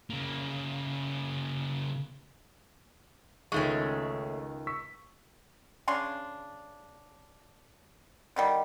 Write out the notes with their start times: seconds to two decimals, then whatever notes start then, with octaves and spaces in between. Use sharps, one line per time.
0.10 C#3 A#3
3.52 C#2 D#3 G#3 A3 C#4 C#6
4.67 C#6 E6 B6
5.88 C#3 C#4 D4 C6
8.36 D3 D#3 G3